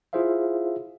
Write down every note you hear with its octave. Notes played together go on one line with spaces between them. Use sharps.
E4 F4 G#4 C5 E5 F5